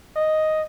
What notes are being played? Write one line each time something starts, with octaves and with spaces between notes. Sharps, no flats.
D#5